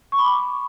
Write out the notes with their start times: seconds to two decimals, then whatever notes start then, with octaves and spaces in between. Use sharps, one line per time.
0.12 C#6
0.18 B5
0.25 D6